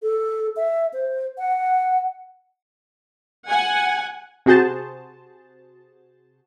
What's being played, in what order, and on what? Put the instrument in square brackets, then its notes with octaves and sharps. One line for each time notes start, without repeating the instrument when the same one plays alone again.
[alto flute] A4
E5
C5
F#5
[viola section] F#5 G#5
[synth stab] C3 F#4 G#4 C5 A5